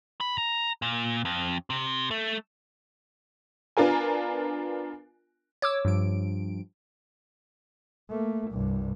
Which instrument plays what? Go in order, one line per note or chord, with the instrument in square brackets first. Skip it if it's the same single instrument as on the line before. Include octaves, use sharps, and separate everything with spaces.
[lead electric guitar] B5
A#5
A#2
F2
C3
A3
[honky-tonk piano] B3 D4 F4 A#4 G#5
[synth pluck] C#5 D6 E6
[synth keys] G2 F3 D7
[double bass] A3 A#3
C2 G2